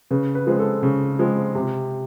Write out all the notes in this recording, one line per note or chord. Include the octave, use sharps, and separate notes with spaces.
C#3 B4
B4
F3 G#3 C4
A4
C#3
F3 G#3 C4
C3